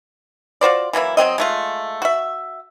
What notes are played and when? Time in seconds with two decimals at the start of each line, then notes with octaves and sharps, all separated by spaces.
0.61 F4 F#4 C5 D5
0.93 E3 F#3 A#3 E4
1.17 F#3 B3 C4 D#5
1.38 G#3 A3 F4
2.02 F#4 E5